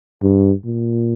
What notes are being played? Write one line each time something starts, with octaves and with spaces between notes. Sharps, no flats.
G2
A#2